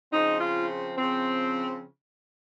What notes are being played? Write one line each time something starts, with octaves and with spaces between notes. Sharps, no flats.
C#3 F3 C4 D#4
F4
C#3 F3 C4